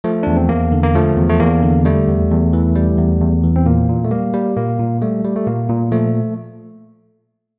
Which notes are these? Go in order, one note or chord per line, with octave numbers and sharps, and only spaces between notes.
F3 A3
E2 D4
C4
E2 A#3
D3
A#3
F3 A3
E2
A3
E2 A#3
D3
G3 A3
E2
E2
E3
G3
E2
E2
E3
C4
A#2 A#3
A#2
A3
G3 A#3
G3
A#2 A#3
A#2
G3 A3
G3
A3
A#2 A#3
A#2
F3 A3